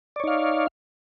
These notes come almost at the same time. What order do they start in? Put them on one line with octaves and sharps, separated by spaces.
D5 C#5 D#4 F5